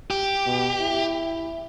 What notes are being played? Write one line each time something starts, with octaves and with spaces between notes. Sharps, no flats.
G4
B2
E4